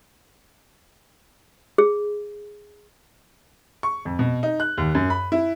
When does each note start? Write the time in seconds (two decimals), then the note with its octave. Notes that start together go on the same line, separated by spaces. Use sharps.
1.78 G#4
3.83 C#6
4.05 F2
4.19 B2
4.43 D#4
4.60 F#6
4.78 D#2
4.95 F#2
5.10 B5
5.32 E4